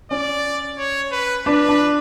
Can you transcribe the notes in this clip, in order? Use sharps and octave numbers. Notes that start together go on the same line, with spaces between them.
C#4 D5
C#5
B4
D4 B4
D4